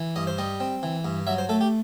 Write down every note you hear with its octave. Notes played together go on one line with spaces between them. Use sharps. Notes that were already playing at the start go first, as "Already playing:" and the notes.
Already playing: E3
G2 D#5
C5
G3 D#5
C4
E3
G2
F#3 E5
C5
A3 A4
G4